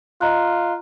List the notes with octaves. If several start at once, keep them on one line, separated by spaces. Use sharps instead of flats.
F4 D#5 A#5 F#6